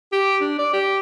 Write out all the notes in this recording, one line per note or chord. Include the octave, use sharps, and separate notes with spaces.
G4
D4
D5
G4